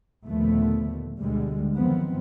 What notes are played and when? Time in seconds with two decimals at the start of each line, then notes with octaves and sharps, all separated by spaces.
0.25 D#2 A#2 D3 F3 A3 B3
1.18 D2 B2 D3 G3 G#3
1.75 F#2 D#3 F3 B3 C4